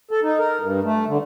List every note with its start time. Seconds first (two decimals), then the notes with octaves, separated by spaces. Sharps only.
0.11 A4
0.23 D#4
0.39 A#4
0.60 G2
0.84 A3
1.08 D3